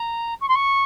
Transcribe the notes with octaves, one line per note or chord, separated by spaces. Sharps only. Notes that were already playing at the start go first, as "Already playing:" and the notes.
Already playing: A#5
C#6
C6
C#6